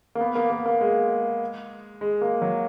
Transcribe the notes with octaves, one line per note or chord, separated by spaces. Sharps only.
A#3
B3
A#3
A#3
A#3
G#3
G#3
A#3
F#3